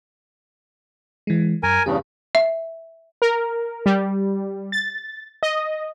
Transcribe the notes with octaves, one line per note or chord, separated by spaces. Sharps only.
E3 G#3
F#2 A#4 G#5
E2 G2 C#3 G4
E5
A#4
G3
A6
D#5